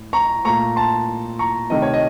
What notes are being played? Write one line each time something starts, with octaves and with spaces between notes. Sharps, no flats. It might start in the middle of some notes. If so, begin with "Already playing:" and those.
Already playing: A2
A#5 C#6
A#2 A3 A#5 C#6
A5 C6
A#5 C#6
C3 D#3 A3 D#5
C#5
D#5